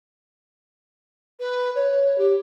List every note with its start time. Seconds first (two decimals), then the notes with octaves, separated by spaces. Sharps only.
1.40 B4
1.75 C#5
2.18 G4